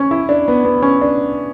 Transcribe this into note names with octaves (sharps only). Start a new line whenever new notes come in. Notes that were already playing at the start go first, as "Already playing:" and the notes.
Already playing: C#4
E4
D4
B3
B3
C#4
D4